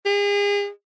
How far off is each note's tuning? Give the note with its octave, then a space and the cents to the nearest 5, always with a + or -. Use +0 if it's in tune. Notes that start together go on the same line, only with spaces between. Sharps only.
G#4 -40